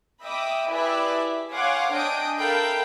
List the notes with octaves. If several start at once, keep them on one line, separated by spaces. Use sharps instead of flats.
D#5 E5 G5 B5 D6 D#6
E4 G4 G#4 B4 D5 E5
C#5 F5 F#5 G#5 C6 D6
D4 D#5 G5 G#5 D#6 D7
A4 A#4 E5 F5 G5 B5